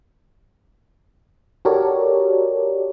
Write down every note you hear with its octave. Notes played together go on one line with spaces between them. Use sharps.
F#4 G4 A4 A#4 C#5 D5